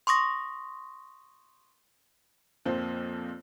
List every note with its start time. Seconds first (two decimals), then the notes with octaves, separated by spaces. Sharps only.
0.07 C6 C#6 D#6 A#6
2.66 F2 A#2 F3 C4